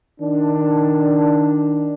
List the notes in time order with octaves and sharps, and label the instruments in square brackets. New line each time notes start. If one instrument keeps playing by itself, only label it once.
[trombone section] D#3 D4